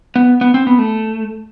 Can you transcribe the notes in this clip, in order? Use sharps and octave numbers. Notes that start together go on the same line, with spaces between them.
B3
B3
C4
B3
A3